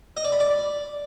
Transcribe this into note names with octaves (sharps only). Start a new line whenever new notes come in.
D#5
D5
B5
D5